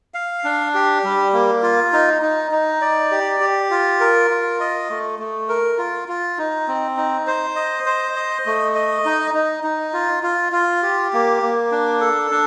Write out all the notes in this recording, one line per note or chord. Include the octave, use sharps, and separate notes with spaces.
F5
D4
G4
G3
A#3
F4
D#4
D#4
D#4
D5
G4
G4
F4
A#4
F4
D#5
A3
A3
A#4
F4
F4
D#4
C4
D#4
C5
D#5
C5
D#5
A3
D#5
D#4
D#4
D#4
F4
F4
F4
G4
A#3
A#3
D4
A4
D4